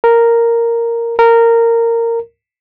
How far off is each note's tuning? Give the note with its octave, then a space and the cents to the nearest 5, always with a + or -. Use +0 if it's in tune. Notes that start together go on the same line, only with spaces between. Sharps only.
A#4 -5
A#4 -15